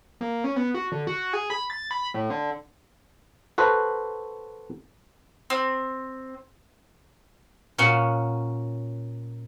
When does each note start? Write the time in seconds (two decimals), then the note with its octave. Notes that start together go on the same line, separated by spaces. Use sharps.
0.21 A#3
0.44 C#4
0.56 B3
0.74 F#4
0.92 D3
1.07 F#4
1.33 G#4
1.50 B5
1.70 A6
1.91 B5
2.14 A2
2.30 D3
3.58 F#4 A4 B4 C5
5.50 C4
7.78 A#2 C#4 F#4